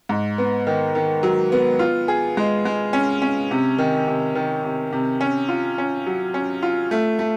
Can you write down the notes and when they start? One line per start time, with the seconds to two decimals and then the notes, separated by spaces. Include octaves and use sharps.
0.09 G#2
0.38 B3
0.67 D#3
0.95 D#3
1.23 F#3
1.52 B3
1.79 F4
2.08 G#4
2.37 G#3
2.65 G#3
2.93 C#4
3.22 C#4
3.51 C3
3.79 D#3
4.07 C3
4.35 D#3
4.64 C3
4.92 C3
5.21 C#4
5.49 F4
5.78 C#4
6.06 F#3
6.34 C#4
6.63 F4
6.91 A3
7.19 A3